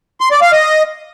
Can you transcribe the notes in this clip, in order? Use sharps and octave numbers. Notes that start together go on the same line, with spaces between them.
C6
D5
F5
D#5